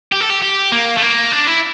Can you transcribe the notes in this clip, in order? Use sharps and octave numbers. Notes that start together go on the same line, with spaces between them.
G4
A4
G4
G4
A#3
A3
A#3
D4
E4